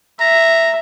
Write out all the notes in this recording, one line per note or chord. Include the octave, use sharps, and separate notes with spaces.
E5 A#5